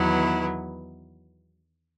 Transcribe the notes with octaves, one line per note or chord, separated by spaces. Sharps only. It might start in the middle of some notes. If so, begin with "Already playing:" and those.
Already playing: E2 D#3 F#3 B3 E4